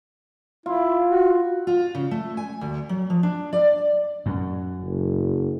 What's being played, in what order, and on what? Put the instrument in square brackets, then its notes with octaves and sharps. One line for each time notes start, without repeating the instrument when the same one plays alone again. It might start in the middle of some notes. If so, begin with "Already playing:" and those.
[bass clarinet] E4 [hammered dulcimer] F4
[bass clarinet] F#4
[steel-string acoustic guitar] F4
C#3
A3
G#5
D2
F#3
F3
D4
D5
[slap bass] F#2
[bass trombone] F#1